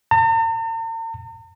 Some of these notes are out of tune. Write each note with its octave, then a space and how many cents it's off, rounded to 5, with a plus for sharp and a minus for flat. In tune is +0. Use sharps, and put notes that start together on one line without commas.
A#5 -45